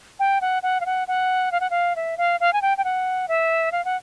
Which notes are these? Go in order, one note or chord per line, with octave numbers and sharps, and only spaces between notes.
G5
F#5
F#5
F5
F#5
F#5
F5
F#5
F5
E5
F5
F5
G#5
G5
G5
F#5
E5
F5
F#5